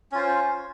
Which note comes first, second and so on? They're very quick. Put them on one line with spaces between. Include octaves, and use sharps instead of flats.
C#4 F4 C5